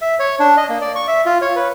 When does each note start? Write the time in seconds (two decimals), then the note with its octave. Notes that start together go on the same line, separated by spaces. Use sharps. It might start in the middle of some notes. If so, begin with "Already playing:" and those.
0.02 E5
0.19 C#5
0.40 D4
0.57 D#5
0.69 A#3
0.81 D5
0.95 C#6
1.08 E5
1.26 F4
1.42 C#5
1.56 B4